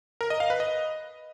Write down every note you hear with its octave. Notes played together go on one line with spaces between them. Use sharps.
A#4
D#5
F5
B4
D#5